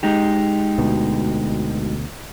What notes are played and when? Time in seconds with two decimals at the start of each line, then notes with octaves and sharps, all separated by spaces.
0.03 G#3 D#4 G4
0.79 D2 B2